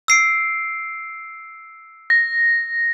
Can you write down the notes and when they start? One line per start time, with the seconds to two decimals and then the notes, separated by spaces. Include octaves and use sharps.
0.08 E6 C7 D7
2.10 A#6